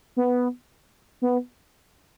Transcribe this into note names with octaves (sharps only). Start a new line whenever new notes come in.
B3
B3